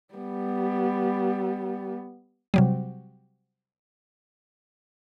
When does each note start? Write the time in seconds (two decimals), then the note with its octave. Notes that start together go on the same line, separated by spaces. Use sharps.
0.14 G3 B3
2.54 C3 F#3 G3